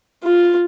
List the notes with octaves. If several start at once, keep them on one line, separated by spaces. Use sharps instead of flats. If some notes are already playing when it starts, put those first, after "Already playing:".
F4